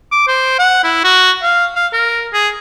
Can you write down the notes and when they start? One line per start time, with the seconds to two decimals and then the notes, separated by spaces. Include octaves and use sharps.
0.12 D6
0.28 C5
0.59 F#5
0.83 E4
1.04 F#4
1.43 F5
1.76 F5
1.93 A#4
2.34 G#4